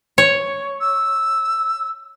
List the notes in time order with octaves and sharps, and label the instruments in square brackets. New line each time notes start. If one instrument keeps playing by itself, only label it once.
[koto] C#5
[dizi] E6